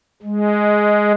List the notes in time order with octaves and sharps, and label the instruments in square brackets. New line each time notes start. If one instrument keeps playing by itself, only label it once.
[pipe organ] G#3